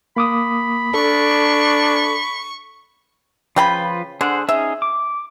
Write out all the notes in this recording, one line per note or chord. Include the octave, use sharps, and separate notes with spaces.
A#3 B5 D6 D#6
D4 A4 C#6
C#3 F3 F4 B4 G5 B5
D3 G#4 C5 F#5
C#4 D#4 G#4 E5
D6